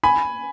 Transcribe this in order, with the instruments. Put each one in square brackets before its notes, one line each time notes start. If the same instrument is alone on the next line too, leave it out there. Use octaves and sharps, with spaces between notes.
[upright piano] G#5 B5